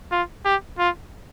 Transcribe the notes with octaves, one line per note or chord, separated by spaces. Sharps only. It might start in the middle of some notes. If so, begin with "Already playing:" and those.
F4
G4
F4